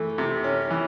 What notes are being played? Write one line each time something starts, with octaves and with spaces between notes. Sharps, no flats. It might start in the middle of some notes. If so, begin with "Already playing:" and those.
Already playing: E3 A3
C3
C#4
E3